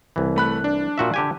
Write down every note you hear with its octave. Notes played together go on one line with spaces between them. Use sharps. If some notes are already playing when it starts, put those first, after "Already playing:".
C2 E3
A3 B5 F#6
D4
A#2 F#4 E5
D3 G4 G#5